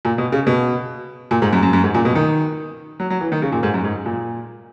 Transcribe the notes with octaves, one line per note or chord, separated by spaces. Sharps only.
A#2
B2
C#3
B2
A#2
G#2
F#2
F#2
F#2
G#2
A#2
B2
D#3
F#3
F#3
E3
D#3
C#3
A#2
G#2
F#2
G#2
A#2